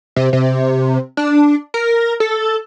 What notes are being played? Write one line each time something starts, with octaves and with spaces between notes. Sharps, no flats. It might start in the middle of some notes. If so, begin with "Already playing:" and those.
C3
C3
D4
A#4
A4